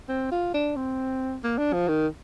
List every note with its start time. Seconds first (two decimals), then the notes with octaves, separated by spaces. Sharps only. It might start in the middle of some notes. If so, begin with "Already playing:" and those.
0.09 C4
0.32 F4
0.54 D4
0.76 C4
1.44 A#3
1.58 D4
1.73 F3
1.88 D#3